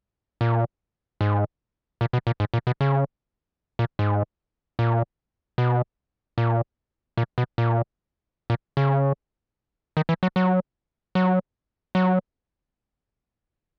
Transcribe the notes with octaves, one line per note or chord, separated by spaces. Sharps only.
A#2
G#2
A#2
B2
A#2
G#2
A#2
B2
C#3
A#2
G#2
A#2
B2
A#2
A#2
B2
A#2
A#2
C#3
D#3
E3
F#3
F#3
F#3
F#3